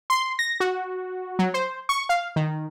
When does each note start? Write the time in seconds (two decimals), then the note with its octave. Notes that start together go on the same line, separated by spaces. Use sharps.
0.10 C6
0.39 A#6
0.60 F#4
1.39 F#3
1.54 C5
1.89 C#6
2.09 F5
2.36 D#3